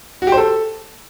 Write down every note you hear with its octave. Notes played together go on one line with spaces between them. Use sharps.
F#4
G4
C5
A4